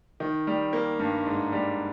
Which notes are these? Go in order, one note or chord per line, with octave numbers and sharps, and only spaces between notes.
D#3
G3
A#3
G2
G#2
G3